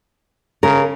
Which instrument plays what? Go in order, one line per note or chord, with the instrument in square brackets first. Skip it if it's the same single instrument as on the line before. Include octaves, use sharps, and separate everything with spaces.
[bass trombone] C#3 [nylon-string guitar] A#4